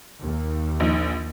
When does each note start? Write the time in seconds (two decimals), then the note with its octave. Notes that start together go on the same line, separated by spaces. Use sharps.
0.24 D#2
0.80 A#1 D#4